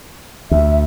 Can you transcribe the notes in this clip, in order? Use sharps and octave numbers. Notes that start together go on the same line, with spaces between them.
D2 E5